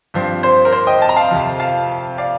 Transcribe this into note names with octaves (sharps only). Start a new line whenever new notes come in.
G2 F3 C4
C5
A#4
C5
D#5 G5
A5
A#5
F5 A5
F2 C3 F3
F5 A5
D5 F5